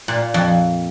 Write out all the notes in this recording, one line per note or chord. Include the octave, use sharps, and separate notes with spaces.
A#2
F2